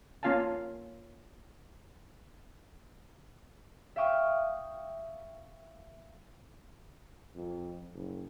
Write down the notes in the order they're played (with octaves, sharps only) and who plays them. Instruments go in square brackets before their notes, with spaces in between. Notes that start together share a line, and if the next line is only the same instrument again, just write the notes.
[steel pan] A#3 C#4 F4 F5 G#5 A5
[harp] E5 F5 G5 C#6 D#6 F6
[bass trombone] F2
F#1